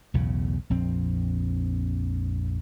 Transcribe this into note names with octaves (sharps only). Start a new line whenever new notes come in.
B1 E2 A2 C#3
A#1 F2 C4